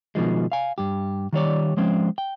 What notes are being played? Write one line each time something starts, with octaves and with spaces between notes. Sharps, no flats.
B2 D#3 F3 G#3
F5 G#5
G2 G4
D#3 G3 C#5 D5
F3 G#3 C4 C#4
G5